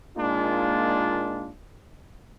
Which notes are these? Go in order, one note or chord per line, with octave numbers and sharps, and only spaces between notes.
A#2 G#3 A#3 D4 D#4 F4